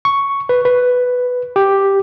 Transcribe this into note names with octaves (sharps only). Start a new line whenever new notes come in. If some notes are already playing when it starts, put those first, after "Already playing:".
C#6
B4
B4
G4